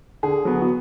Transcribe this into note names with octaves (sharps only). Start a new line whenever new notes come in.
D3 G#4
F#3 B3
F#4